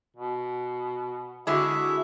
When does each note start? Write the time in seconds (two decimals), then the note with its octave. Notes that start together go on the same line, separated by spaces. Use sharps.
0.17 B2
1.47 D3 G#3 E4 F#4 E5